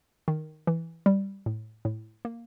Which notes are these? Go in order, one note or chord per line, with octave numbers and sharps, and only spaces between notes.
D#3
E3
G3
A2
A2
A#3